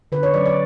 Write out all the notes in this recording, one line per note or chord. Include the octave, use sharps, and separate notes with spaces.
D3 B4
C#5
F#3 C#4 D5
D5